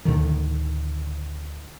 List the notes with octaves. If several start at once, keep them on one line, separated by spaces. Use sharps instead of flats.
D2 A2 D3 D#3